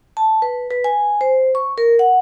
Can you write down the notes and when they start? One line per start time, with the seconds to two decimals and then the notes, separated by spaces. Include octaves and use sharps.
0.17 A5
0.42 B4
0.71 B4
0.84 G#5
1.21 C5
1.55 C#6
1.78 A#4
1.99 F#5